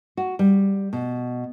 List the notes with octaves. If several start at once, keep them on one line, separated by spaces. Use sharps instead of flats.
F#4
G3
B2